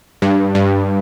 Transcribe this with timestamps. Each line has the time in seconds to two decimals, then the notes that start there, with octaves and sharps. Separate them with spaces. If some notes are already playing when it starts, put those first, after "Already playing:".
0.22 G2
0.55 G2